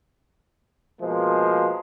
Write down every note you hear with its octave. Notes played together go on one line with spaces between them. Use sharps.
B2 F3 G#3 A#3 C5